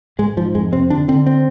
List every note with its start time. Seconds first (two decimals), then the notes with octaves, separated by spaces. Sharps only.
0.19 G#2 G#3
0.37 G#2 F3
0.55 F2 G#3
0.72 C3 C4
0.90 D3 D4
1.08 D3 C4
1.26 C4